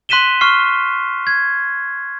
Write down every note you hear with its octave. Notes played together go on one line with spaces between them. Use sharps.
C6 F#6 B6 D#7 E7 G7
C#6 F6 C7
G#6